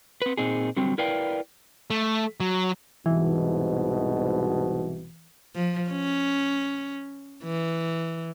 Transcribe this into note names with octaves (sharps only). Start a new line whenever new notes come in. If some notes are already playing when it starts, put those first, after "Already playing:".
C4 B4
A#2 C4 D#4 G#4
D3 F#3 G3 C4
E4 A#4 B4 D5 F5 G5
A3
F#3
C2 G#2 B2 E3
F3
C#4
E3